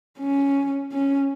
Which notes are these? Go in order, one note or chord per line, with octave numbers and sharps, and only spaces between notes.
C#4
C#4